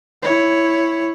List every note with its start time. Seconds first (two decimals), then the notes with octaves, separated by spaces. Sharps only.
0.22 E4 C#5